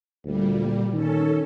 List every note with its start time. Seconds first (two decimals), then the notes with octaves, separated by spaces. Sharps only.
0.25 D2 A#2 G3
0.93 D#3 C#4 A4